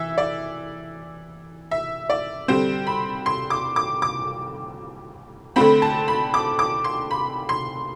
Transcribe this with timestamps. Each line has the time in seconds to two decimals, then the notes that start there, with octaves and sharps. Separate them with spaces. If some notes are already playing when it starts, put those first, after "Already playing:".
Already playing: E3 E5
0.18 D5
1.71 E5
2.10 D5
2.48 D3 G3 C4 C5
2.87 B5
3.26 C6
3.50 D6
3.76 D6
4.02 D6
5.56 D3 A3 C4 B5
5.82 A5
6.08 B5
6.34 D6
6.59 D6
6.84 C6
7.11 B5
7.49 C6